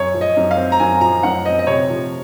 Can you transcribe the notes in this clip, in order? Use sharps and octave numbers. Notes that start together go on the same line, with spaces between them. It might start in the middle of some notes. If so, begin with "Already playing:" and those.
Already playing: F#2 C#5
F3
D#5
F#2
F5
C4
A#5
F#2 G#5
F3 A#5
F#2 F#5
C4 D#5
D#5
C3 C#5
F3